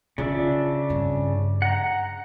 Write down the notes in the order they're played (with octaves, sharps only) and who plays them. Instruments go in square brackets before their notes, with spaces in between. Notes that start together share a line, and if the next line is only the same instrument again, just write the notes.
[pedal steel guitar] C#3 D4 E5 [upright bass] F4
[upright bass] G2 C4
[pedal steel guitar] F#5 A#5